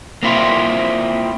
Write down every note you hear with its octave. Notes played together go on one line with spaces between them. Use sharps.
A#3 C4 E4 F4